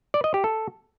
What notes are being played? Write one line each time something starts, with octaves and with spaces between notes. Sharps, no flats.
D5
D#5
G4
A4